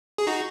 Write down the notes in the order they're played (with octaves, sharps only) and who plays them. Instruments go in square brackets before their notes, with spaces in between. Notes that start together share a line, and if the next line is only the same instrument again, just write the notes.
[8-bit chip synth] G#4
D#4 F#4